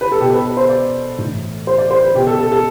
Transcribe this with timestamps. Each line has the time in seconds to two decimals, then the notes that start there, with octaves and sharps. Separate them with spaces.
0.01 B4
0.12 A4
0.21 B2 G4
0.30 A4
0.33 B4
0.46 B4
0.57 C5
0.69 D5
1.18 A2 E3
1.67 C5
1.78 D5
1.91 C5
2.04 B4
2.15 B2 G4
2.27 A4
2.39 A4
2.52 A4